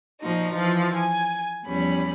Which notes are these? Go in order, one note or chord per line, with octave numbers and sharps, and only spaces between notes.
A#2 F3 D#4 F#4
E3 F3 F4
G#5
E2 F3 G3 C#4 B5